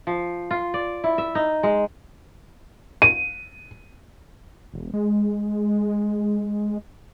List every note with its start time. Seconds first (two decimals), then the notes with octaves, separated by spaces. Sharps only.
0.07 F3
0.51 F4
0.74 D5
1.04 E4
1.18 E5
1.35 D#4
1.63 G#3
3.02 D#7
4.74 E1
4.93 G#3